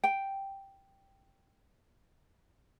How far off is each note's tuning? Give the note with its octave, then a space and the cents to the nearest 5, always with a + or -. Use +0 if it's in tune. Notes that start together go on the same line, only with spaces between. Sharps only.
G5 -5